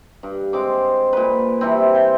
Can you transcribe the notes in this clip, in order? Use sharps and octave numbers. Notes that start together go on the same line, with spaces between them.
G2
G#3 C4 D6
A#2 B4
C3 E3 G3 C4
G5